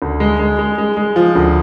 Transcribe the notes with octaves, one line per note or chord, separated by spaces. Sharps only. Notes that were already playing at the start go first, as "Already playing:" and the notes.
D2
G#3
G#3
G#3
G#3
G#3
F3
D2